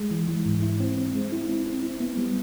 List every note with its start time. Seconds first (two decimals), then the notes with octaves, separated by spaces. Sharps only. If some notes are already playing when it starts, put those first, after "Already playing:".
Already playing: G#3
0.11 E3
0.28 E3
0.46 G#2
0.62 E4
0.80 C4
0.97 C4
1.15 G#3
1.32 E4
1.49 C4
1.66 C4
1.83 E4
2.00 B3
2.17 G3